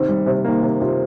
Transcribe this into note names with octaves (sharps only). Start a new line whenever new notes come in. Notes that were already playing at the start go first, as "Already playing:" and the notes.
Already playing: C3 D#3 C4
G3
C3 C4
D#3 A#3
C3 C4
C3 F4